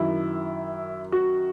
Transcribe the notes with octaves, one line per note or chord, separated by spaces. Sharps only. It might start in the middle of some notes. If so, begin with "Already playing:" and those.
Already playing: F#2 D#3 E4
F#4